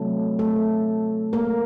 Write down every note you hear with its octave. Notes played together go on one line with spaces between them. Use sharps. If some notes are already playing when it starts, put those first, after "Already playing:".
Already playing: C3 F#3 A3 C4 A4
A3 A4
A#3 A#4